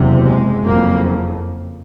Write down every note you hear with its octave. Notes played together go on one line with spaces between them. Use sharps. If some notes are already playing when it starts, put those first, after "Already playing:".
Already playing: F#1 E2 C3
G#3
F#1 F2 C#3 A#3